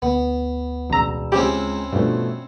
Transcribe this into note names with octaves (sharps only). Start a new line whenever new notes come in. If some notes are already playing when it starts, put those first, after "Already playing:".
D2 B3
E1 A1 A#5 E6
C#2 G#3 C4 C#4 E4 G4
G2 B2 F3 A3